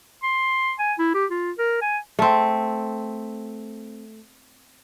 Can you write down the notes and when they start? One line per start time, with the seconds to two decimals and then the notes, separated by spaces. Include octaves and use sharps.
0.23 C6
0.79 G#5
0.98 E4
1.14 G4
1.31 F4
1.58 A#4
1.82 G#5
2.19 A3 C4